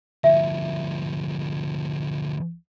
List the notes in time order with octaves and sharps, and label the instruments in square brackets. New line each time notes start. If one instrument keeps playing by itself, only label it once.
[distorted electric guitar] D2 F3 [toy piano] E5